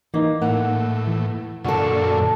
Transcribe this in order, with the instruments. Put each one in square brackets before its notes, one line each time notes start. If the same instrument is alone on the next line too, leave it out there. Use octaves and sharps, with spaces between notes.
[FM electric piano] E3 D#4 [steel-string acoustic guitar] A#3
[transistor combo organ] A2 [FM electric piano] A#3 [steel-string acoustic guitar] F#5
[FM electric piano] E3
[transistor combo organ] F#2 A#2 D3 [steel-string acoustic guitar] F#4 A4